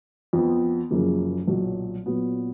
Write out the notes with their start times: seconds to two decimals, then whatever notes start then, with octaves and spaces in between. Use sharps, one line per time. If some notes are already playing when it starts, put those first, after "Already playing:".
0.33 F2 F3 B3
0.91 F#1 F#2 C#3 F3 A#3
1.47 B1 A#2 F#3
2.06 A#2 F#3 B3